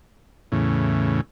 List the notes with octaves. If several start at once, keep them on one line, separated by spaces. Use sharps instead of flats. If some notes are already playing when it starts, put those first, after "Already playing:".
E2 A2 C#3